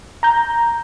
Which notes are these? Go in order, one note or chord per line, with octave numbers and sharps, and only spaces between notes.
A#5 G6